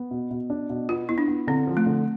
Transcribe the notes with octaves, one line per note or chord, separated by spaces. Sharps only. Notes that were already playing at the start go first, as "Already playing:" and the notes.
Already playing: B3
B2
B2
D4
B2
B3 F4
B3 E4
D4
B3
D3 C4
F3
A3
D3